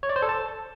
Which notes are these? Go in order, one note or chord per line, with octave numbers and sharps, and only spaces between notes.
C#5
D5
C5
A4
A5